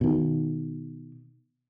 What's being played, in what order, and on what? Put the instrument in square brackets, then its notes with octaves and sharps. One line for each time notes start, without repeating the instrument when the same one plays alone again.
[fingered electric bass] B2 D#3